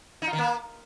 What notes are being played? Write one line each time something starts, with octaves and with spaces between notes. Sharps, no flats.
D#4
F4
D#3
A#3